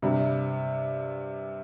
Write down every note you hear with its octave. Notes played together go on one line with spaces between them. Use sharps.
G2 C3